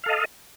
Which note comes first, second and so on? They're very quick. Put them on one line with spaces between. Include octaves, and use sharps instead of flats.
F5 A4 D#5